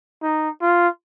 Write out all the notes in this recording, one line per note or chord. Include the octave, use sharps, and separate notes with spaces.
D#4
F4